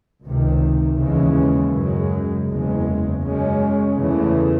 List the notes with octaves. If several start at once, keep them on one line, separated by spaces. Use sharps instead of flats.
C#2 C3 D#3
D#2 C#3 E3 G#3 C#4
F#2 C#3 G#3
F#1 E2 C#3 G#3
F#2 C#3 G#3 C#4
E2 C#3 E3 A3